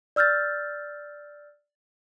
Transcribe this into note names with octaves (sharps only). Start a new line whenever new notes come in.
D5 E6 F6 G6 A6